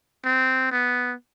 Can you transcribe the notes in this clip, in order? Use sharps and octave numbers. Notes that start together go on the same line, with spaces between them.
C4
B3